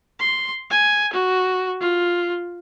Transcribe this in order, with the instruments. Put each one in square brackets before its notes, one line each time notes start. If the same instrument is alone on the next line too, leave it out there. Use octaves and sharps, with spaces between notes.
[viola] C6
G#5
F#4
F4